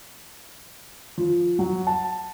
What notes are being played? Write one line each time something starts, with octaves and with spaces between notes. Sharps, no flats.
F3
F#3
A5